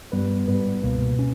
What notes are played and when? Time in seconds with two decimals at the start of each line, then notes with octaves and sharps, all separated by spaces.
0.12 G2 G3 B3 B4
0.48 G#2 G3 B3 B4
0.83 C#2 B2 A#3
1.19 C#4